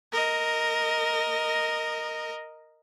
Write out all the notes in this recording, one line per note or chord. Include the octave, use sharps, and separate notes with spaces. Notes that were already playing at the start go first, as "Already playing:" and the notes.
A#4 D#5